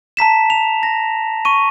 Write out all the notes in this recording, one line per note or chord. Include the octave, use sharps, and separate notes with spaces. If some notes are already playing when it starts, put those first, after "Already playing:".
A5 A#5 B6 E7
F7
A#6
C#6 D#7